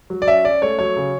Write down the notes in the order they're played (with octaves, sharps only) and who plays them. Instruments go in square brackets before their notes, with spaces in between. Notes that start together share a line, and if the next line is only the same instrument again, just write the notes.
[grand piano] F#3
D5
C#4 E5
C#4 D5
A3 C#5
F#3 C#5
C#3